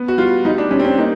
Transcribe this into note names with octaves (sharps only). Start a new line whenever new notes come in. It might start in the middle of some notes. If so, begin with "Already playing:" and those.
Already playing: B3
F#4
G3 F4
G3 D#4
D4
G3 C#4
C4
C#4
A#3 D#4